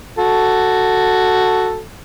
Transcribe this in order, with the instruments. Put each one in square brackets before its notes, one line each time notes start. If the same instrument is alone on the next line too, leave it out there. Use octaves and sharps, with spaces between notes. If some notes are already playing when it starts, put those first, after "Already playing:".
[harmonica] F#4 A4